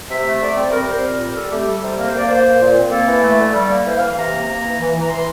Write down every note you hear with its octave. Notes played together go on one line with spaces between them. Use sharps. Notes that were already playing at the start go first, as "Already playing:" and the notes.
C3 E5
A3
D3 D5
C4
G3 A#4
A#4
C4 C5
A#2 A#4
G3
C4 A4
A3 G4
G3 A4
C3
A#3 A#4
C5
A#3 D5
A#3 C5
A#3
A#2
C4
A#3 A4
E3
A3
D3
G3
A#3
E3 C5
F5
E3
F5
C3 A#5
A#3
A#3
E3
E3
E3
A#5
E3 C6